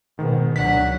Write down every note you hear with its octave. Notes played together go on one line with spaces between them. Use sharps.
G#2 B2 D#3
C#2 F#3 D4 F#5 B6